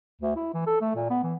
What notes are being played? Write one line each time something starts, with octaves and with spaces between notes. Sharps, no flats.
D2
E4
E3
A4
A3
A#2
B3
E3